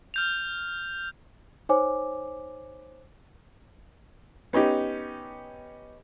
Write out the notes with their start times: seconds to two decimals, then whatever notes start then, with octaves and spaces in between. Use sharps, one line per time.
0.14 F6 G6 F7
1.69 D#4 C5 C#5 G#5 D6
4.53 B3 C#4 D#4 G4